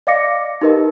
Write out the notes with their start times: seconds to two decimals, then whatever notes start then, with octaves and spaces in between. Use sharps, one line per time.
0.07 D5 D#5 F5 D6 A#6 C#7
0.61 D#4 G4 A#4 B4 D#5